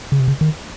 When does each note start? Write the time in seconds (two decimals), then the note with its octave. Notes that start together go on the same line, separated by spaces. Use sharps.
0.12 C#3
0.20 C3
0.28 C#3
0.41 D#3